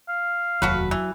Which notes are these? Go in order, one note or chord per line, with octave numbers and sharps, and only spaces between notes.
F5
F1 D#2 F#3 A3 F#4 B4
E3